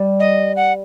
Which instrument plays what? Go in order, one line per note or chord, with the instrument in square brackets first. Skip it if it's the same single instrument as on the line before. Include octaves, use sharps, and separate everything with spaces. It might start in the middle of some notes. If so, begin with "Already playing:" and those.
Already playing: [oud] G3
[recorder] D#5
F#5